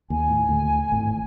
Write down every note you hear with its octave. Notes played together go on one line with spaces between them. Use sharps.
D#2 G#5
A2
D2
G#1 A2